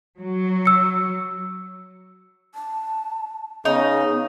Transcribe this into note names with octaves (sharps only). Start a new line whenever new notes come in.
F#3
E6 C#7
A5
C#3 B3 D#4